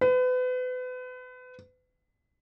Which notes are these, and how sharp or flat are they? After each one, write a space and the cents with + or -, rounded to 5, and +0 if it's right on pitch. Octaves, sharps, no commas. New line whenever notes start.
B4 +35